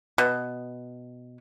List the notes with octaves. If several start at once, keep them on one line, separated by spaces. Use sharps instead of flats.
B2